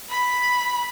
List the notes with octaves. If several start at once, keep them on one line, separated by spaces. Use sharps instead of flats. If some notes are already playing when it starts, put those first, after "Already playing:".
B5